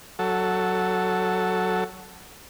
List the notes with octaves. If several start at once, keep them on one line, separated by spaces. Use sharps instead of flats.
F#3 A4